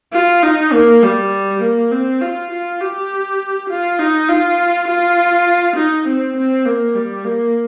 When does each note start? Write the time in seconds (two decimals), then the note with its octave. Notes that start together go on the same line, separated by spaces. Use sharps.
0.13 F4
0.43 D#4
0.73 A#3
1.03 G3
1.62 A#3
1.92 C4
2.21 F4
2.51 F4
2.81 G4
3.70 F4
3.99 D#4
4.29 F4
4.88 F4
5.76 D#4
6.07 C4
6.37 C4
6.65 A#3
6.95 G3
7.25 A#3